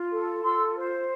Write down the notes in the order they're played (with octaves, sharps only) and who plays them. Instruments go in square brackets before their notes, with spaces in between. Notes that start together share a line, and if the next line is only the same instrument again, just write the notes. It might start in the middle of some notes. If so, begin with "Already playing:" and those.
Already playing: [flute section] F4
A4
F4 C6 E6
C5